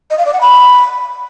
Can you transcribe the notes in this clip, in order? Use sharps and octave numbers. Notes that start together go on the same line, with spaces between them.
D#5
F5
D5
F#5
B5